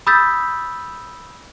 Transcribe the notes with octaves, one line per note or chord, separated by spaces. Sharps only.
B5 D#6 E6 G6 A6 B6